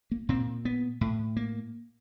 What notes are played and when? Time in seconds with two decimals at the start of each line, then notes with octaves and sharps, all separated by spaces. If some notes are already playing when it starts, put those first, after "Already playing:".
0.11 A#3
0.29 A#2 C4
0.65 B3
1.01 A2
1.37 A#3